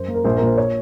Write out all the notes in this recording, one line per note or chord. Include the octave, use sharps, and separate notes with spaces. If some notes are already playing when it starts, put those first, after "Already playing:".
Already playing: F#2 C5
A#3
A#4
A#1 C5
A#2 A#4
C5
C#5